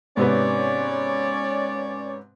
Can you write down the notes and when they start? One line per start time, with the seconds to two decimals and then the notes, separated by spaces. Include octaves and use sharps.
0.17 G#2 C3 B3 C#4 C#5 D5